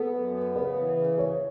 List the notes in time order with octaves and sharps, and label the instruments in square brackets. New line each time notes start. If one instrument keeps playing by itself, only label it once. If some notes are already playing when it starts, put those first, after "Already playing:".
Already playing: [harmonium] B3 [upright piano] A4
[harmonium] F#2
B3
[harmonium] C#3 [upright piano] B4
[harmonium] E3
C#3
[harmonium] C#3 [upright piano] C#5